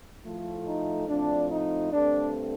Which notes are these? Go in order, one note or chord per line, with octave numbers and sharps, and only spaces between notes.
A2 F3 A3
D#4
A2 F3 C4 D4
D#4
G2 D3 A3 C4 D4